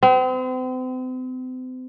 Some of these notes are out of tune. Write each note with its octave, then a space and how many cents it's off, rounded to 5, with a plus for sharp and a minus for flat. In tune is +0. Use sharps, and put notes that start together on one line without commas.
C4 -40